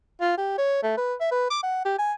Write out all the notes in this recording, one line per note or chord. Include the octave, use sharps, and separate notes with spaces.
F4
G4
C#5
A3
B4
E5
B4
D6
F#5
G4
G#5